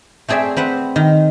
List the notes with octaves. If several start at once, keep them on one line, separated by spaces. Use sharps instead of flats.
A3 C4 G#4 D5 E5
C4 B4 F#5
D#3